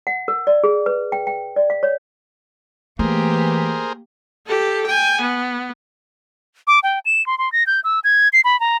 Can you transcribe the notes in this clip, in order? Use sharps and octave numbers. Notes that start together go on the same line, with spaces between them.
F#5
A#4
D5
G#4
B4
G5
G5
D5
F5
C#5
E3 A3 A#3 G4 G#4 A#4 C5
G4 A4
G5 G#5
B3
D6
G5
E7
C6
C6
A#6
G6
E6
G#6
C7
B5
A#5